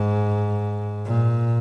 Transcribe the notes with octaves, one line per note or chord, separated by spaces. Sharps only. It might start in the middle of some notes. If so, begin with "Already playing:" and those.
Already playing: G#2
A#2